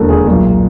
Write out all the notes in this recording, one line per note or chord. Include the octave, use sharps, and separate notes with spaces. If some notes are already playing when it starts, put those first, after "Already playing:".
Already playing: E1 D#2 D3 A4 A#4
G#4
B1 A#2 G#4